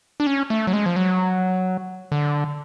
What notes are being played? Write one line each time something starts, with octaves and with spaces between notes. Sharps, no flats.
D4
C#4
A3
F#3
G#3
F3
F#3
D3